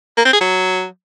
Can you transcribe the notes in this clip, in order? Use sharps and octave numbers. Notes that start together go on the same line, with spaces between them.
A#3
C4
G#4
F#3